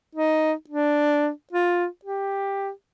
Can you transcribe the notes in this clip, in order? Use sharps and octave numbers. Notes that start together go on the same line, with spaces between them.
D#4
D4
F4
G4